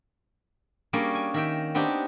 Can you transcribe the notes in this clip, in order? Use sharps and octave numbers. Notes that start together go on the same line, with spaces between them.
G3 A#3 C#4 D4 G#4
G#5
D#3 E5 G5
B3 C4 D4 D#4 G4